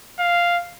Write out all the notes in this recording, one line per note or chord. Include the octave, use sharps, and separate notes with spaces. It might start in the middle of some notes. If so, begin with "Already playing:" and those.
F5